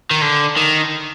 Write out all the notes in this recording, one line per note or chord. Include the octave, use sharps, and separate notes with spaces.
D#3
D3
D#3